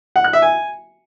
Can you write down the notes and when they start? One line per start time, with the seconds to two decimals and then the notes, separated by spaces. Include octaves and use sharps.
0.16 F#5
0.24 F#6
0.33 E5
0.42 G#5